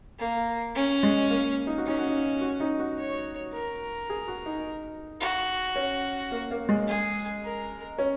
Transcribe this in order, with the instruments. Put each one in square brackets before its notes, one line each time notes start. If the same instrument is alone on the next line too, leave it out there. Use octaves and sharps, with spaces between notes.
[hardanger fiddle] A#3
C#4
[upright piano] G#3
A#3
D#4
F#4
[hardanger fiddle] C#4 [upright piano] D#4
[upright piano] F#4
D#4
F#4
D#4
F#4
[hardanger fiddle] C#5
A#4
[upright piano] G#4
F#4
D#4
[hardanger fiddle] F#4
[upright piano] C#4
A#3
A#3
G#3
[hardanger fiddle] G#4
A#4
[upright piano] C#4